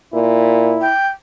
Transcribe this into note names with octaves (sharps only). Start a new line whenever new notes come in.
A#2 E4
G5